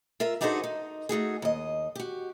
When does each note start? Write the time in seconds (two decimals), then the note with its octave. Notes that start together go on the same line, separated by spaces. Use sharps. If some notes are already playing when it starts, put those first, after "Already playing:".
0.20 F4 A#4 E5
0.41 D4 D#4 F#4 G#4 A4 C5
0.64 D#4
1.09 A3 D#4 F#4 G#4
1.42 D#2 D#5
1.95 F#4 G4